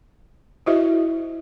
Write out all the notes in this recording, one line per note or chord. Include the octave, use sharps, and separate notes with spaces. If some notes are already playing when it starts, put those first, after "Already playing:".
E4 F#4 G#4 C5 D#5 E5